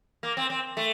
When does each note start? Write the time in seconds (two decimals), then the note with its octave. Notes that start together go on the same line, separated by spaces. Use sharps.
0.23 A#3
0.37 C4
0.50 C4
0.77 A3